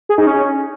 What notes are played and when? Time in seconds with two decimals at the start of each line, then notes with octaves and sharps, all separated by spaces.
0.09 G#4
0.18 D#4
0.27 C#4